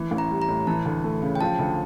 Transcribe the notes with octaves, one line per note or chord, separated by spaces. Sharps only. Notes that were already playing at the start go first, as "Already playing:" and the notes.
Already playing: E3
A1
A#5
G3
A#5
A2
E3 A5
D2
A3
C#3
G5
F3 A5
D2